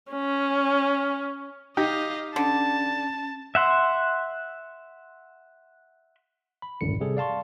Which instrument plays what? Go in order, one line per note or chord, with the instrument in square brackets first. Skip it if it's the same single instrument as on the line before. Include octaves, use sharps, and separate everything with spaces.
[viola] C#4
[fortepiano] D#4 G4 [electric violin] D#5 F5
[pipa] D3 [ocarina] C#4 [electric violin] A5
[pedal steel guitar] E5 F#5 C6
[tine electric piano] B5
G#1 C#2 F#2 A2 D3 C#7
C3 G3 G#4 A4
D5 F5 A5 C6 C#6